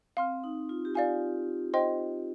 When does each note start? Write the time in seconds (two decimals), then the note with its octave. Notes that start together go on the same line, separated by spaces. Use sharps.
0.17 C4 F5 C6 F6
0.44 D#4
0.69 F4
0.85 G4
0.95 F4 D5 F5 G#5
1.74 C5 D#5 G5 C6